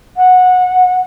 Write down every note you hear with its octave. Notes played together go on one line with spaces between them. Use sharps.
F#5